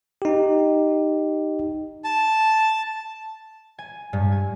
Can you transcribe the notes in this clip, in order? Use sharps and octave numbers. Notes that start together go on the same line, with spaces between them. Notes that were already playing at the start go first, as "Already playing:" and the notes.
D#4 G4
A5
G#5
G2
G#5